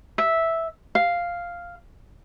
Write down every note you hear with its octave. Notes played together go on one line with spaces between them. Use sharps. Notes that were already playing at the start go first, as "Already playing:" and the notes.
E5
F5